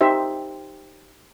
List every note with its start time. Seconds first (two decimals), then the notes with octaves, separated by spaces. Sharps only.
0.01 D#4 G4 C5 E5